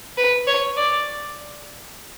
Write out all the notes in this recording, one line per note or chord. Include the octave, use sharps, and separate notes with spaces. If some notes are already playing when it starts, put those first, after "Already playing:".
B4
C#5
D5